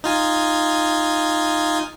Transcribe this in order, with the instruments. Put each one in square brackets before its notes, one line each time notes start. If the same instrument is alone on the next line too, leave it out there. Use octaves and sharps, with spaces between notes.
[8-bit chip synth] D#4 F4 G#5